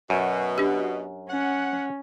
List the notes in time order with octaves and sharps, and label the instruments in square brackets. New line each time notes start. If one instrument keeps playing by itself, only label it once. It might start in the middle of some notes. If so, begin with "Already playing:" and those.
[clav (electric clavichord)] F#2 [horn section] B2
[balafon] D4 G4
[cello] C#4 [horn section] F#5